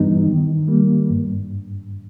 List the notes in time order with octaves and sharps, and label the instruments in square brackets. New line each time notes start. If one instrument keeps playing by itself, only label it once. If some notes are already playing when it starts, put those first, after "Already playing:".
Already playing: [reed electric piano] G2 E3 G3 B3 D#4
D#3
G3 A#3
G2